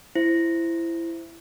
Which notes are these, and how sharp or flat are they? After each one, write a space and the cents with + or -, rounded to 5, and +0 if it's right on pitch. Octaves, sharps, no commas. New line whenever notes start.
E4 +20 C5 +0